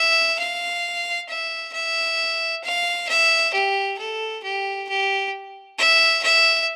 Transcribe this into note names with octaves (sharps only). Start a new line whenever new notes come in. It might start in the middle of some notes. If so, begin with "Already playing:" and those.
Already playing: E5
F5
E5
E5
F5
E5
G4
A4
G4
G4
E5
E5